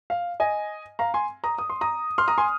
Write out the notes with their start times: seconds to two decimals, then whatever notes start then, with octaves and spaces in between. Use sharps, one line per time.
0.10 F5
0.40 D#5 G#5
0.99 F5 A#5
1.14 G#5 C6
1.44 A#5 D#6
1.58 D#6
1.70 C6
1.81 A#5 D#6
2.18 C6 F6
2.28 A#5 D#6
2.38 G#5 C6